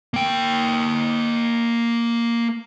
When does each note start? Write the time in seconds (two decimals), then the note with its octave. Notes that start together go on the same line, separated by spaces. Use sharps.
0.14 A#3 G5